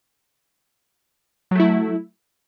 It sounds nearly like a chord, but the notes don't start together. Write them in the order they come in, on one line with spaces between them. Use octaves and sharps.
F#3 A3 E4